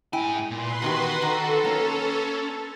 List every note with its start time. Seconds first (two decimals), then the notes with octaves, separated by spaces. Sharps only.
0.13 G#2 E4 G5 G#5
0.51 A#2 B4 C6
0.82 E2 D#3 F#4 G4
1.22 D#3 A4
1.65 A#3 C#4